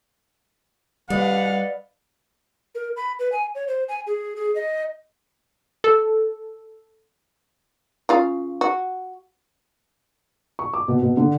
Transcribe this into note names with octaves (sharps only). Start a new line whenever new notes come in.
G3 B4 D5 D#5 F5 F#5
A#4
B5
B4
G#5
C#5
C5
G#5
G#4
G#4
D#5
A4
C#3 F4 F5
F#4
C#6
D6
B2
B2
D3